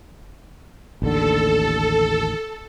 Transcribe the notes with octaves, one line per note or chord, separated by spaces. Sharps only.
A1 D#2 D3 A4